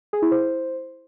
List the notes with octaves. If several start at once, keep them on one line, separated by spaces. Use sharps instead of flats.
G#4
E4
C5